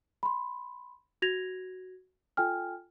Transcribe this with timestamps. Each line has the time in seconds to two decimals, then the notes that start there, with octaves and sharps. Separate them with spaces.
0.23 B5 C6
1.22 F#4 G#6 A#6 F7
2.37 F4 A4 G5 G#5 F6